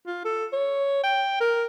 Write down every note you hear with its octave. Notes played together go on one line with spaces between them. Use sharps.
F4
A4
C#5
G5
A#4